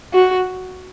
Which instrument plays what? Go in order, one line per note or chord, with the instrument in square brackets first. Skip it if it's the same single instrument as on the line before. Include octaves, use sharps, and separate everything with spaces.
[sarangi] F#4